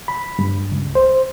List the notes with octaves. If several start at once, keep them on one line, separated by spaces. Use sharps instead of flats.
B5
G2
C#2
C5